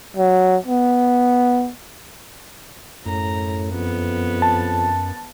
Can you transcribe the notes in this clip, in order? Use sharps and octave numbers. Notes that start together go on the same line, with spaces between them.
F#3
B3
F#2 A2 A#5
F2 B3
A5